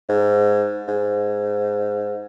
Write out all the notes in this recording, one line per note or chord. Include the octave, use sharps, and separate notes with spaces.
G#2
G#2